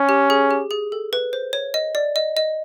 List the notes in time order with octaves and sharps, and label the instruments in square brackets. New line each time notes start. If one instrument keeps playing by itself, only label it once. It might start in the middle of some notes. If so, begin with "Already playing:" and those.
Already playing: [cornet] C#4
[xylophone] G4
G#4
G4
G#4
A4
B4
C5
C#5
D#5
D5
D#5
D#5